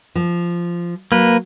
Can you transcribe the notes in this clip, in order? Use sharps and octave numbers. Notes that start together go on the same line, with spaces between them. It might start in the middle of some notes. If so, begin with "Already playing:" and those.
F3
F#3 A#3 B4